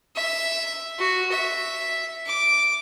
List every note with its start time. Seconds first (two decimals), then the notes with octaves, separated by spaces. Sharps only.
0.16 E5
0.99 F#4
1.31 E5
2.27 D6